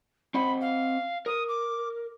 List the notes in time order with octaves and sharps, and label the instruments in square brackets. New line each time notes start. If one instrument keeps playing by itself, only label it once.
[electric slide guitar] C4 D#5 F#5 [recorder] B5
[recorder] F5
[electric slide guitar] A#4 [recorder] D#6
[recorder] D6